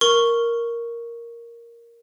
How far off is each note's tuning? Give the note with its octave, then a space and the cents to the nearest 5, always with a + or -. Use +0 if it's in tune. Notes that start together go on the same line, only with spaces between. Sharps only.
A#4 +0 C#6 +0